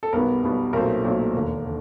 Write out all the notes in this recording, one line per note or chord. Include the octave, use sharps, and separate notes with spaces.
A4
B1 B2 G3 B3 A#4
B1 B2 G3 B3
B1 A#2 F#3 A3 C4 A#4
B1 A#2 F#3 A3 C4
E1 D#2 D3
D3